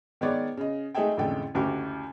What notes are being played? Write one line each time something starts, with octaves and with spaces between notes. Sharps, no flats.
D#3 G#3 B3 C#5 D5
C#3 D#5
G#3 A3 D#4 G#4 E5 G5
A1 F2 D3 G#3 A3 G5
F#1 D2 F#4 G4